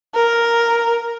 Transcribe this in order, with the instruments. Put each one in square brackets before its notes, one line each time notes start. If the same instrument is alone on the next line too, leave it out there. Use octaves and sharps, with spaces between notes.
[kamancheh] A#4